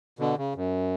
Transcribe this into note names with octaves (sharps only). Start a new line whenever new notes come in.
B2 D3
C#3
F#2